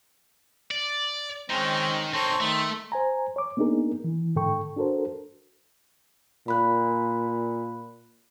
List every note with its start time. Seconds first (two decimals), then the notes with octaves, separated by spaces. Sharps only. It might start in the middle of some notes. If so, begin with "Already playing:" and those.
0.71 D5
1.50 D#3 G#3 C4 C#4 D#4
2.13 C4 D#4 A4 C5 C#5
2.40 D#3 A3 C6
2.92 C5 G#5 A#5
3.36 C#5 D6
3.57 A#3 B3 D4 D#4 G#4 A#4
4.04 E3
4.36 G#2 D3 A4 G5 C#6
4.76 D4 F#4 A4 A#4 C5
6.48 A#2 B5 F#6